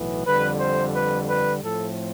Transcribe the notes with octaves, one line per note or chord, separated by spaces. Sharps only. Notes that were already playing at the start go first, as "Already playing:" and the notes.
Already playing: B1 A2 E3 B3
F2 D3 G3 B4
C5
B4
B4
A2 F3 A3 C4 A4